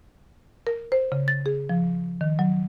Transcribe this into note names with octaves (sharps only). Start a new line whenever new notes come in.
A#4
C5
C#3
A6
G#4
F3
D#3
F#3